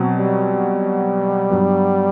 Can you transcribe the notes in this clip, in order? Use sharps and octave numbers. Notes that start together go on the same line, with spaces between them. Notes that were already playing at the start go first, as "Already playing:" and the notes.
Already playing: B2 F#3 C4
G3
G2 F#3 B3